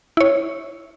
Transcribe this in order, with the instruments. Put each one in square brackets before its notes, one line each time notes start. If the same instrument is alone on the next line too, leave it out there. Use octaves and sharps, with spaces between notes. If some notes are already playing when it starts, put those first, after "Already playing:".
[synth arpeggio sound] E4 C#5